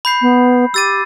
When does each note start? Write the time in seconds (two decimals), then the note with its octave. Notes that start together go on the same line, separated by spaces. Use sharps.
0.05 B5 G6 C7
0.21 B3
0.74 G4 E6 A6 D#7